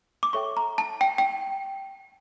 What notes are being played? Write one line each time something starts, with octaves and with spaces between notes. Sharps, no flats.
D6
A4 C#5 E5 G5 C#6
A#5
A5
G5
G5